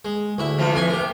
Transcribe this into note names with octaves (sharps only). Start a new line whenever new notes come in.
G#3
D2 E4 E5
C3 E3 F3
F2 D#5 G#5
G4 A#4